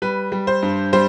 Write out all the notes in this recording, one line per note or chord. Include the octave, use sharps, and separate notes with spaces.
G3 B4
G3
C5
G2
G3 C5